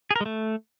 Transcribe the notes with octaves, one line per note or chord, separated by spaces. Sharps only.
G#4
A#4
G#3
A3